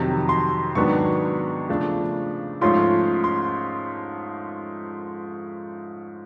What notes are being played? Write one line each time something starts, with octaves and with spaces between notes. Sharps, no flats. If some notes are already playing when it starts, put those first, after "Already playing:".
Already playing: F2 C3 D#3 F#3
C6
G#2 D#3 F#3 B3 D4 C#6
C#3 F3 A3 D4
G#2 F3 A3 C#4 F4 C6
C6